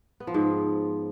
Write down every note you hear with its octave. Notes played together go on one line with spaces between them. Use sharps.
B3
F3
G#2